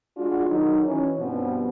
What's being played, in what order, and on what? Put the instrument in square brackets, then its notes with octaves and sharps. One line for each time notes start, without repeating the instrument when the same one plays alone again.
[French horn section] G#3 D4 F4 F#4
D#3 F#3 D#4
E3 C#4
G2 B2 F3 B3 C4